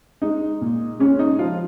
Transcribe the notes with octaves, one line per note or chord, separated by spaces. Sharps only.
G#3 D#4
A#2
G#3 C#4
D#4
F3 F4